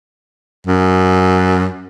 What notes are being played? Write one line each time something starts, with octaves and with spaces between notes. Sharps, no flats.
F#2